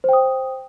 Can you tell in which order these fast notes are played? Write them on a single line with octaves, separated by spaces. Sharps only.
C5 G5 D#6